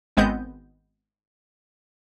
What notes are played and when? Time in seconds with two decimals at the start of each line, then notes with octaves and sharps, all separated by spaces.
0.17 G#1 G#3 B3 C4 D#5 G6